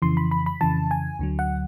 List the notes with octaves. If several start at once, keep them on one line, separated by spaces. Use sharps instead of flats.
F2 C#3 E3 C6
B5
B5
B5
F2 C#3 E3 A5
G#5
D2 D3 F#3
F#5